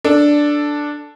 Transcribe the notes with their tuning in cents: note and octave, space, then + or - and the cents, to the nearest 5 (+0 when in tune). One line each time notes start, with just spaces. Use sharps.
D4 +0 A4 +0